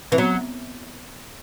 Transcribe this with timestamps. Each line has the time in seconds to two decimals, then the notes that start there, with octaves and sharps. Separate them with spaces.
0.12 E3 C4
0.18 F#3 B3